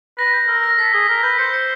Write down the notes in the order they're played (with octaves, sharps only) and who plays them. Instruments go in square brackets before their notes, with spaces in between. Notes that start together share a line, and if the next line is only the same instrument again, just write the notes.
[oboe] B4 [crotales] A#6
[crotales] G6
[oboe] A#4 [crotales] E6
[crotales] A#6
[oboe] A4 [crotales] B6
[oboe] G#4 [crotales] G7
[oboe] A#4 [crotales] B6
[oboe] B4 [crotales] G6
[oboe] C5 [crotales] C#7
[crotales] C#7